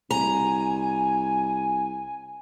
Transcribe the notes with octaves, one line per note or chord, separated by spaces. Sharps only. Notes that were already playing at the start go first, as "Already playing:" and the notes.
C2 G#5 A#5